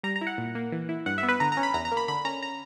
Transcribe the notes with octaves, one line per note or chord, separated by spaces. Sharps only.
G3 A#5
A#5
E4
F#5
A#2
A#3
E3
E4
G2 F#5
E5
B3
B4
D3 A#5
C#4 A#5
B5
E2 A#5
A#5
A#3
B5
D3 B5
C#4 A#5
A#5